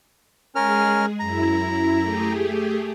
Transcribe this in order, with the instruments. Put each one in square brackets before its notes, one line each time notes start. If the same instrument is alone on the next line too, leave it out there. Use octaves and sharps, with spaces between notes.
[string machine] G#3 G#4 [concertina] C#4 A#4 F6
[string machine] F#2 E4 [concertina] A#5
[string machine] A3 G4 G#4